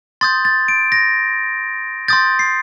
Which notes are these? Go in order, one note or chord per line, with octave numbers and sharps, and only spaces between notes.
C6 D#6 G6 A6
A6
D7
A#6
C6 D#6 G6 A6
C7